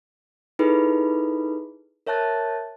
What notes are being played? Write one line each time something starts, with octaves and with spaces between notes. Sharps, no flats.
D#4 E4 G#4 A4 B4 B5
A#4 C#5 E5 A5 F#6 A6